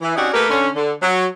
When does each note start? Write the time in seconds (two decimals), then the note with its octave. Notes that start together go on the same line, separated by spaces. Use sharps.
0.02 E3
0.16 C4 C#4 D#4 F#4 G4 D5
0.34 A3 A#3 G4 A#4 B4
0.49 D3 C#4
0.76 D3
1.02 F#3